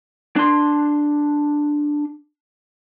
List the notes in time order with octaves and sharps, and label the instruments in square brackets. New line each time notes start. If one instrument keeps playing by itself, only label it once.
[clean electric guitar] D4 C6